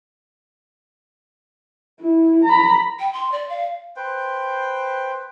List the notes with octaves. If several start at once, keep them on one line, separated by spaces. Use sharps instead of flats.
E4
A#5 B5
G5
C6
D5
F5
B4 C5 G5